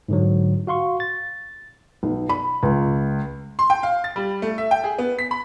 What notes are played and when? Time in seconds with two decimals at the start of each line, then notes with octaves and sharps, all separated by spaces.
0.09 G#2 D3 F#3
0.67 F#4 F5 C6 C#6
1.00 A6
2.03 B1
2.29 B5
2.63 C#2
3.59 C6
3.70 G5
3.83 F5
4.04 A6
4.16 G3
4.42 A3
4.58 E5
4.71 G5
4.84 G#4
4.98 B3
5.19 B6
5.31 B5